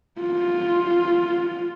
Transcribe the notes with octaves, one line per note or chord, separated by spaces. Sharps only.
F4